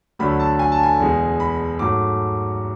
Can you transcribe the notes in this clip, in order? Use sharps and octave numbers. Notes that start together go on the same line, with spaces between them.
D2 D3 F#3 A3 B5
A5
G#5
A5
G#5
E2 B2 G#3
B5
G#2 F#3 A3 D6